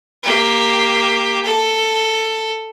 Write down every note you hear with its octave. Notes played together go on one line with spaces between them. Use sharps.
A#3 G4
A4